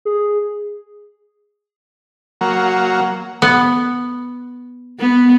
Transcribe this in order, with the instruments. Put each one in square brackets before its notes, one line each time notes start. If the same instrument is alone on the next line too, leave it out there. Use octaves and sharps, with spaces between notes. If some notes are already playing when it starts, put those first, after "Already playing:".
[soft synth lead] G#4
[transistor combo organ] F#3 A#3
[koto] B3
[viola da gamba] B3